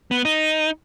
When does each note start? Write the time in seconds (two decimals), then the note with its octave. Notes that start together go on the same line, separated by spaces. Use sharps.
0.11 B3
0.25 D#4